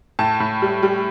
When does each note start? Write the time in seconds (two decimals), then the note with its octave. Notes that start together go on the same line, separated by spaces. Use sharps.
0.19 A2 A5
0.40 A2
0.62 G3
0.83 G3